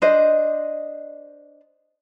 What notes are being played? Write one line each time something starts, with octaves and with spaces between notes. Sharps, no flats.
D4 C5 D#5